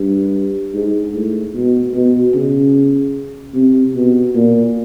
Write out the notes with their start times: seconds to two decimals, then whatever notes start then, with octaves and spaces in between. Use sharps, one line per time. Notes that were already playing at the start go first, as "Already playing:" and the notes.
Already playing: G2
0.74 G#2
1.14 A2
1.54 B2
1.94 B2
2.35 C#3
3.54 C3
3.95 B2
4.35 A#2